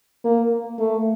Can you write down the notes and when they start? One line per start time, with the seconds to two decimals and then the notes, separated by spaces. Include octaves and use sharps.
0.24 A#3
0.79 A3